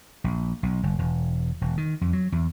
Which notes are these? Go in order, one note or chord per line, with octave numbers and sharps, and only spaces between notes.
A#1
B1
F#1
E1
E1
D#3
F2
F#3
E2